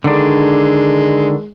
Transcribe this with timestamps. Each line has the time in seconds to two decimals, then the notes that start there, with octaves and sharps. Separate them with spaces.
0.04 D3 D#3 G#3 D4